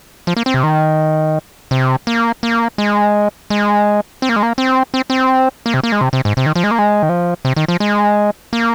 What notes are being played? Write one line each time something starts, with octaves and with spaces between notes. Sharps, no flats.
F3
A#3
C4
C3
D#3
C3
A#3
A#3
G#3
G#3
C4
A#3
G#3
A#3
C4
C4
C4
A#3
C3
A#3
G#3
C3
C3
G#2
C3
D#3
F3
G#3
A#3
G#3
D#3
F3
C3
D#3
F3
G#3
A#3